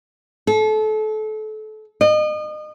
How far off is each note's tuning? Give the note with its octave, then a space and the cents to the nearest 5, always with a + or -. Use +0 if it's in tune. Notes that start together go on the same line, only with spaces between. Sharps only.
A4 -30
D#5 -35